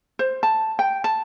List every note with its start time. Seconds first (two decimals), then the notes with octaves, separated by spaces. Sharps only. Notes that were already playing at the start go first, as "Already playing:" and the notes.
0.19 C5
0.43 A5
0.79 G5
1.04 A5